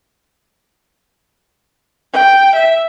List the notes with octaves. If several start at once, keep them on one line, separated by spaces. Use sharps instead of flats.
G5
E5